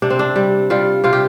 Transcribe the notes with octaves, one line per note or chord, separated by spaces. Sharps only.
C3 D4
C4
D4
G3
G3 F4
C3 F4
G4